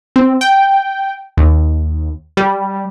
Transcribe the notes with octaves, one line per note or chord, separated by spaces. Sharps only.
C4
G5
D#2
G3